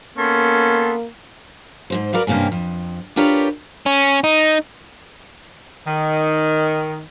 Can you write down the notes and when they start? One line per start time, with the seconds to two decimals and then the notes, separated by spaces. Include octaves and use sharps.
0.18 A#3 B3 C#4 A4 C6
1.90 G#2 B2 C5
2.13 F#4 A#4 B4 D5 F5
2.27 G2 C3 A#3 C4 C#4
2.52 F2
3.16 D4 F4 G4 A#4 B4 C#5
3.86 C#4
4.24 D#4
5.86 D#3